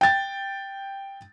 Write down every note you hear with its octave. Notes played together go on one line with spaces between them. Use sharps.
G5 A6